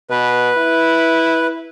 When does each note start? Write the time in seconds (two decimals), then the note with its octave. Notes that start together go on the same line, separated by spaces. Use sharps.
0.10 B2 B4
0.58 E4